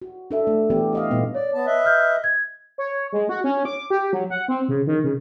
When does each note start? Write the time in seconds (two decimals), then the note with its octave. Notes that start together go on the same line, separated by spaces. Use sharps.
0.02 F#4
0.31 D4 A4 E5
0.47 A3
0.70 E3 F#3 B3 G4 D5
0.93 G4 D#5 F5
1.11 A#2 G3 B3 D#4
1.35 C#5 D5
1.54 B3 A5
1.66 B4 D#5 E5
1.85 F6 G6
2.24 G#6
2.78 C#5
3.13 G#3
3.29 F#4
3.44 C#4
3.65 D6
3.90 G4
4.13 F#3
4.30 F#5
4.48 C4
4.69 C#3
4.87 D#3
5.04 C#3